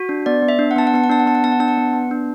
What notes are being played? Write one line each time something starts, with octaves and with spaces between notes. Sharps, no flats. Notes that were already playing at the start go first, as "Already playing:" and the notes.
Already playing: F#4
D4
B3 D5
B3
E5
D4
F#5
B3 A5
F#5
B3 A5
F#5
D4 A5
F#5
B3 A5
F#5
B3 A5
F#5
D4 A5
F#5
B3
B3
D4